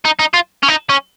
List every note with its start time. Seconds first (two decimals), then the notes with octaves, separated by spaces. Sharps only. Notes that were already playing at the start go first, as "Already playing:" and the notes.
0.05 D#4
0.19 D#4
0.34 F4
0.63 C#4
0.68 D#4
0.90 C#4